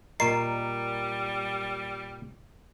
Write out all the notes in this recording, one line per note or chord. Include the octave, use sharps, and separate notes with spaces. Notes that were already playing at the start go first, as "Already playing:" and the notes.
A#2 G3 A#4 D#5 A#5 C#6 C7